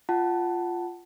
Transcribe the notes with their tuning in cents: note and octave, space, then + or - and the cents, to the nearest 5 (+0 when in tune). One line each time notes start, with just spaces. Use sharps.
F4 +0 F#5 +20 A5 +0